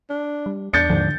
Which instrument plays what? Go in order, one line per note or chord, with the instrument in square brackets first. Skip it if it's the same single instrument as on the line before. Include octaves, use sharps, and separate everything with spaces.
[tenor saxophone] D4
[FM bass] G3
[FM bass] E2 [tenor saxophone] D4 [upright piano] G6 A6 C#7
[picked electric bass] D#2 G#2 F3 [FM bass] D3